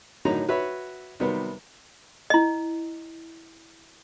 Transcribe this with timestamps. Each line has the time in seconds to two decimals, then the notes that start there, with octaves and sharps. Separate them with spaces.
0.25 A2 D3 D#3 F#3 D#4 A#5
0.49 F#4 B4 C#5 E5 B5
1.20 C3 D#3 F#3 G3 B3
2.30 E4 D#5